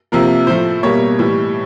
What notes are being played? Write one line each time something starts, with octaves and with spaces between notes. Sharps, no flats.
C3 F3 A#3 A#4
A2 F3 A3 C5
B2 G3 A#3 C#5
A2 E3 G3